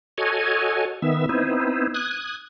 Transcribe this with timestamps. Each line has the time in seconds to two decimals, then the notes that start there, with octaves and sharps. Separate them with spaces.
0.18 F#4 A4 C#5 D#5 G#5
1.02 D#3 B3 E5
1.29 B3 C4 D#4 E4
1.94 D#6 F#6 G#6